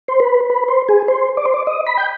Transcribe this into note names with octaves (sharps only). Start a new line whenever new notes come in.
C5
B4
B4
C5
G#4
C5
D5
C5
D5
D#5
B5
G5